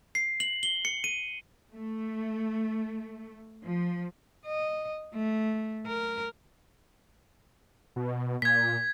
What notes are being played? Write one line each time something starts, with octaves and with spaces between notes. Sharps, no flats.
C7
F#7
G7
C#7
D#7
A3
F3
D#5
A3
A#4
B2
A#2 G#6 B6